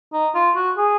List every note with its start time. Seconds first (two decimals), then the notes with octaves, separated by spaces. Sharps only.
0.13 D#4
0.35 F4
0.55 F#4
0.78 G#4